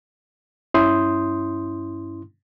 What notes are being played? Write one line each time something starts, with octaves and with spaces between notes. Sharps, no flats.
G2 C#4 E4 C6 D#6 G6